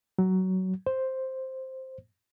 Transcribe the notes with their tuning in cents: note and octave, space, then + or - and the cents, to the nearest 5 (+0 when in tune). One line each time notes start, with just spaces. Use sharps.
F#3 +15
C5 +0